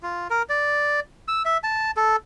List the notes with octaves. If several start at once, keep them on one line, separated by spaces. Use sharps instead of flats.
F4
A#4
D5
E6
E5
A5
A4